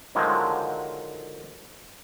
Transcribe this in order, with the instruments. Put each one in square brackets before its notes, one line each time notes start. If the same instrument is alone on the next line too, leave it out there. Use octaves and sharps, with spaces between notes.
[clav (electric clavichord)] D3 D#3 F3 F#3 G#3